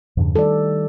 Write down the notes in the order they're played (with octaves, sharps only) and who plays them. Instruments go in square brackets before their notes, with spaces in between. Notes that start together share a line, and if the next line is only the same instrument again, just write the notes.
[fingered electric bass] E2 G2 C#3
[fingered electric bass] D#3 G3 [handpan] A4 D5